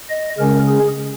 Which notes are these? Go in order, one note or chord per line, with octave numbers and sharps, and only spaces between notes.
D#5
C#3 G#3 C#4 A#4
G#4